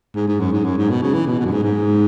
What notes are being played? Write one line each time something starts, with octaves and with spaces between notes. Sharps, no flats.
G#2
G#2
F#2
G#2
F#2
G#2
B2
C#3
E3
B2
B2
F#2
G#2
G#2